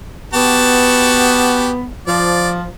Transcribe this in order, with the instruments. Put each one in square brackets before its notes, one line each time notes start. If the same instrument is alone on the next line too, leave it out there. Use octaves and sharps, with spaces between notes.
[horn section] B3 [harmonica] F#4 G4 A5
[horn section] F3 [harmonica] D5